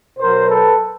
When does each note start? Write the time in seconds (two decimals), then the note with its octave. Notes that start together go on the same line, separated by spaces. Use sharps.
0.19 B2 F#3 A#4 C5
0.48 A4 B4